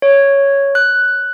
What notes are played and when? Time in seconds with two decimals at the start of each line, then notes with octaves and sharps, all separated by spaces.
0.02 C#5
0.75 F#6